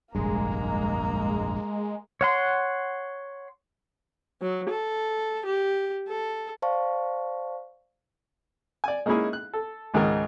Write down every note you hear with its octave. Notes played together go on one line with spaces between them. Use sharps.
F1 A#1 G2 G#3 A#3 A#5
C#5 F#5 C6
F#3
A4
G4
A4
C5 D5 F5 A5 C#6
D5 G#5
G#3 A#3 C#4 D#4 E4 G#4
F#6
A4
C#2 G#2 D#3 G#4 A#4 D#5